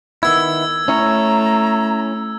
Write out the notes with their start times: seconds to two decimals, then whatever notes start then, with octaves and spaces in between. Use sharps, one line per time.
0.23 D#3 B3 E4 E6 G#6
0.88 A3 C#4 E4 C#5 A#5